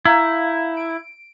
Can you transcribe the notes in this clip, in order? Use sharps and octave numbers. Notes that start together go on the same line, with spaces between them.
E4 F5 A#5 G6
D7